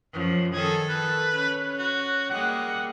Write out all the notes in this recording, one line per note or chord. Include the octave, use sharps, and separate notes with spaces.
F#2 F3
D#3 G#4 A4
B4
C#4
F#4
G3 G#3 A#3 F#5